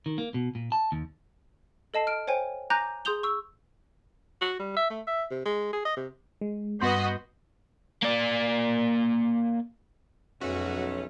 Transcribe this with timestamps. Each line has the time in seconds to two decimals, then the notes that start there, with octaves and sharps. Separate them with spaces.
0.06 D#3
0.18 A#3
0.34 B2
0.55 A#2
0.72 A5
0.92 D#2
1.94 A4 D#5 A5 C7
2.07 F6 D7
2.27 C5 C#5 G5 G#5
2.70 G#5 A#5 D6 F#6 G6 A#6
3.05 G#4 C6 D#6 G6 F7 G7
3.23 C#6 E6
4.41 F#4
4.59 G3
4.77 E5
4.90 A3
5.07 E5
5.31 C3
5.45 G#3
5.73 G#4
5.85 D#5
5.97 C3
6.41 G#3
6.80 G2 B3 F#4 D#5 C6 G6
8.02 A#3 D5
10.41 B1 F2 G#3 A3 C#4 F#4